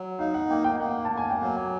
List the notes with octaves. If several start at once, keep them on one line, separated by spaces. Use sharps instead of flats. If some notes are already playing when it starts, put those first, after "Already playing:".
Already playing: F#3
D#4 F5
F#5
A#3 G5
G5
A#3 F#5
A5
A#3
G#5
G5
F#3 F#5
G#5